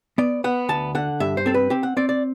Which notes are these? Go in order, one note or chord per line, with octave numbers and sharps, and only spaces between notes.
B3 D5
B3 F#5
D2 A5
D3 F#5
G2 E5
C5
C4 A4
B4
C4 G4
F#5
C4 D5
D5